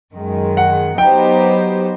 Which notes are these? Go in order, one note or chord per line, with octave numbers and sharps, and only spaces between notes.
F#2 D#3 G#3
F#5
F#3 B3 D#4 G4 C5 G5